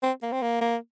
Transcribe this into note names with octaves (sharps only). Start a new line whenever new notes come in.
C4
A#3
C4
A#3
A#3